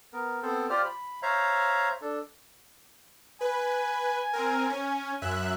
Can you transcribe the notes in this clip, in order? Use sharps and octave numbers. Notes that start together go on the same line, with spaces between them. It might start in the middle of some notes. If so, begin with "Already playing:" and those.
B3 A#4
B3 C4 A4 C5
F4 G4 C5 D5 F6
B5
C5 C#5 E5 F5 A#5
D4 A4
B4 G#5
C4 A#4
C#4
F#2 E5 F#6